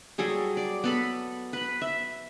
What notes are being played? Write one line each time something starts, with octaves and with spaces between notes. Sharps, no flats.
F#3 G3 G#4 A4
D5
B3 A4 B5
B4 B5
E5